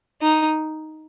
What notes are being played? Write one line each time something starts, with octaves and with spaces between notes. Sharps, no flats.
D#4